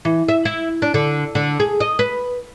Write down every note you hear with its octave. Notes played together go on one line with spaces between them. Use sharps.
E3
E5
E4
D4
D3
D3
G#4
D#5
B4